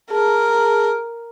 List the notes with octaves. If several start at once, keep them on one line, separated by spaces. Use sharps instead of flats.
G#4 A#4 A5 A#5